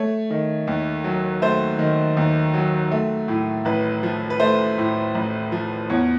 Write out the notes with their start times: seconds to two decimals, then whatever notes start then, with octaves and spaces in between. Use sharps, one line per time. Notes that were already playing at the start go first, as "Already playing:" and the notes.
Already playing: A3 C#5
0.30 D#3
0.67 D#2
1.04 F#3
1.42 A3 C5
1.79 D#3
2.17 D#2
2.54 F#3
2.91 A3
3.28 A2
3.65 A1 B4
4.03 F3
4.30 B4
4.40 A3 C5
4.78 A2
5.15 A1
5.52 F3
5.90 E2 C#5